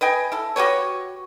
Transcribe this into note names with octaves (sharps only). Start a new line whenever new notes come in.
B4 D#5 G5 G#5
E4 A4
F#4 G4 B4 C#5